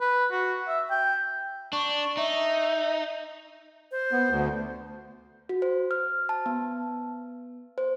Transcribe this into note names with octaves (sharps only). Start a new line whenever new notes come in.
B4
F#4
E5
G5
D4 C#6
D#4 E5
C5
B3
D2
F#4
C5
F6
A5
B3
C5